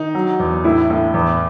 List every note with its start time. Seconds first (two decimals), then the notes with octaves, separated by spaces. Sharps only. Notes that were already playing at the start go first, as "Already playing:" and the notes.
Already playing: D#3 D#4
0.15 F#3
0.40 E2
0.64 A2 E4
0.90 A2
1.14 E2